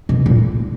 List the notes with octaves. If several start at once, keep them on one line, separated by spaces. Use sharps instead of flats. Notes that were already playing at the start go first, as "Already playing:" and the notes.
B2
A#2